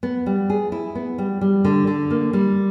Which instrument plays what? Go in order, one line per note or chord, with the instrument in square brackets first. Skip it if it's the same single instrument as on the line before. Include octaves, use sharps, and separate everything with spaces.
[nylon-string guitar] B3
G3
G#4
E4
B3
G3
G3
D3
D3
A#3
G3